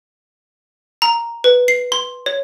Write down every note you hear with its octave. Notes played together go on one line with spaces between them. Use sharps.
A#5
B4
C7
C6
C#5